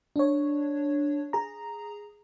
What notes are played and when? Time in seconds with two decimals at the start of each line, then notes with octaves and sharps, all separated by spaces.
0.16 D4 C#5
1.33 G#4 A#5